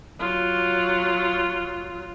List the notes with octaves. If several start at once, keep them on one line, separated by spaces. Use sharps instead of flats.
F#3 F4